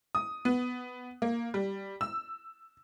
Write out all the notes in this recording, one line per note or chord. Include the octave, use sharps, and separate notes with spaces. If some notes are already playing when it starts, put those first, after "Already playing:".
D#6
B3
A#3
G3
E6